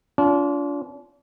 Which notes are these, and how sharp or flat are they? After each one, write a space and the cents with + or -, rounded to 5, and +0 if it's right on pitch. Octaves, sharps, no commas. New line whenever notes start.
D4 -40 F4 +0